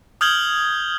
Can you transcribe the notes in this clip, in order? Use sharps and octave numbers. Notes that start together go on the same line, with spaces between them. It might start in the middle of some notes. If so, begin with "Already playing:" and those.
D#6 F6 G6 G#6 F#7 G7